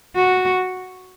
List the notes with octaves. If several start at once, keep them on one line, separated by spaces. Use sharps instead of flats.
F#4